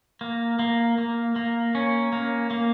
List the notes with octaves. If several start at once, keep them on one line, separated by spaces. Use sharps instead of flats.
A#3
A#3
A#3
A#3
C#4
A#3
A#3